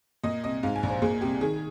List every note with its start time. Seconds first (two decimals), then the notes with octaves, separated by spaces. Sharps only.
0.23 A#2 D#5
0.44 C2 D#5
0.63 G#2 F5
0.76 G#5
0.83 A#1
0.89 C5
1.02 A#2 G#4
1.21 C2 G4
1.40 D#3 G#4